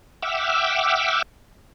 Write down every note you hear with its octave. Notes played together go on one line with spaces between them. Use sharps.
E5 F#5 G5 D6 E6 F6